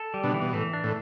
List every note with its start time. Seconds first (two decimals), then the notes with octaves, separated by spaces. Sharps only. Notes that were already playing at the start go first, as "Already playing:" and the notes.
Already playing: A4
0.14 G3
0.23 B2 D3
0.34 E3
0.42 B2
0.53 A2 E3
0.73 D4
0.84 A2